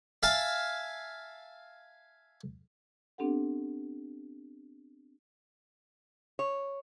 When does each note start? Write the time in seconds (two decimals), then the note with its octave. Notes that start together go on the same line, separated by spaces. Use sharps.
0.23 E5 F5 G#5 A5
3.18 B3 C4 D4 G4 A4 F#5
6.39 C#5